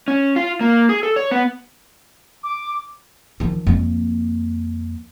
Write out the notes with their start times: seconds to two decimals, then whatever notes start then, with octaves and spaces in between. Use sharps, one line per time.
0.08 C#4
0.36 F4
0.61 A#3
0.89 G#4
1.03 A4
1.16 C#5
1.31 B3
2.43 D6
3.40 D#3 F3
3.67 F2 A#3